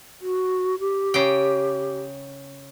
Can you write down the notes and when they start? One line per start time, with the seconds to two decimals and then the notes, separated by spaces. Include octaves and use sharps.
0.22 F#4
0.79 G4
1.14 C#3 G5